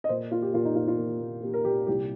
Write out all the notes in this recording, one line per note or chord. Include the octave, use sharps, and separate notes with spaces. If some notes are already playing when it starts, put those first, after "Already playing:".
D#5
A#2 C5
A#3 F4
G4
A#2 F4
D#4
A#2 F4
F4
A#3
A#3
A#3 G4
A#4
A#2 G4
C2 G4